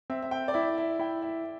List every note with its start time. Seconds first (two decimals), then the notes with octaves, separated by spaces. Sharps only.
0.10 C4 E5
0.22 E5
0.31 G5
0.48 D5
0.54 E4 E5
0.78 E5
0.99 E4 G5
1.22 E5